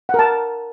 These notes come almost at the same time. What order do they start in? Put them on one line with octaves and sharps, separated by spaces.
F#5 A#4 A5